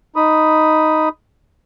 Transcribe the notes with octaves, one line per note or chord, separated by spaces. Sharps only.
D#4 B5 D#6